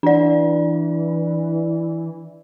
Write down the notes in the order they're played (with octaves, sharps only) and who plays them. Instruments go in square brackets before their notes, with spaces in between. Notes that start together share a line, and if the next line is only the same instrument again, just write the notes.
[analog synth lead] E3 [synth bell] D4 D5